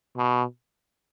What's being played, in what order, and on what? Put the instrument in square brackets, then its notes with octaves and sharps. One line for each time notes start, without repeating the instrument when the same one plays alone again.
[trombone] B2